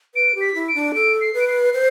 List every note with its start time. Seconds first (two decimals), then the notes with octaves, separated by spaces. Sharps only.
0.15 B4 D7
0.35 G4
0.41 B6
0.55 E4
0.68 D7
0.75 D4
0.94 A4 D7
1.21 C7
1.34 B4
1.40 D7
1.48 C7
1.74 C5